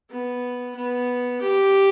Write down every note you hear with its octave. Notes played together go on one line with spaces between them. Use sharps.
B3
B3
G4